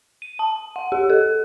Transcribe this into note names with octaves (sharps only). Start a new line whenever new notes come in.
D#7
A5
F#5
G4
A4